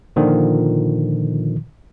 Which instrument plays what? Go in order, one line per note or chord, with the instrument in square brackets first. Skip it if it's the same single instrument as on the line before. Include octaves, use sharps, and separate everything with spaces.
[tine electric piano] A#2 D3 D#3 F3